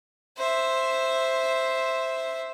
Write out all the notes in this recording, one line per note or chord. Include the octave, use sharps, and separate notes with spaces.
C5 E5